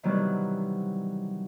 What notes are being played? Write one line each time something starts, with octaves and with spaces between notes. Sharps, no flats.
C3 D#3 E3 F#3 G3 B3